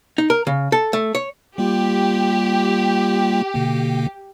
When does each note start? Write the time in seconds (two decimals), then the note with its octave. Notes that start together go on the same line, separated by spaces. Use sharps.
0.18 D#4
0.30 A#4
0.47 C#3
0.72 A4
0.93 A3
1.15 C#5
1.58 G3 A#3 F4 G4
3.54 B2 D3 A#3